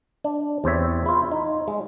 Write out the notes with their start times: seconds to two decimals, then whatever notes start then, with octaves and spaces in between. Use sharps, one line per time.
0.24 D4
0.64 E2 C4 G4 C#5 E5
1.06 E4 F4
1.32 D#4
1.68 G#3